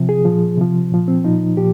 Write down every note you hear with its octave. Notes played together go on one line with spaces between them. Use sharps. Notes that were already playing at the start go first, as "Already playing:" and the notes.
Already playing: C3 F3
G#4
A#2 F3
C3 F3
A#2 F3
C4
A#2 F3 D#4
A#2 F3 G4